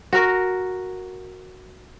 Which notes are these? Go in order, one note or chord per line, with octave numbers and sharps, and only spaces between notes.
F#4 A#4